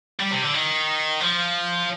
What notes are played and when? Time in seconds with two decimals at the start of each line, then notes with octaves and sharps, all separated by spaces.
0.19 G3
0.31 C3
0.42 D3
0.54 D#3
1.21 F3